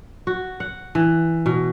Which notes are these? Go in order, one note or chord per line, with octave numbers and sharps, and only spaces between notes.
F#4
F#5
E3
B2